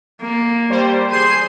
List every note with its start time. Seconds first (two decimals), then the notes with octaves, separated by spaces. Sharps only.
0.22 A#3
0.70 G3 C5
1.11 G#4 C5 C7 D#7